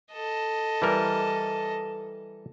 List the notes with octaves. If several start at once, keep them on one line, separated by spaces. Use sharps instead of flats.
A4 D#5
E3 G3 A#4